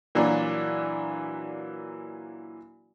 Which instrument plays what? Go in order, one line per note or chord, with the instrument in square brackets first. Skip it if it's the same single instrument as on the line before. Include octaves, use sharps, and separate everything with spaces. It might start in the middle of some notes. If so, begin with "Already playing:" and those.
[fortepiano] A#2 E3 F#3 A#3 D4 F#4